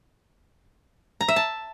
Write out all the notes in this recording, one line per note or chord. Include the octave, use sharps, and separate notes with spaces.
A#5
E5
A5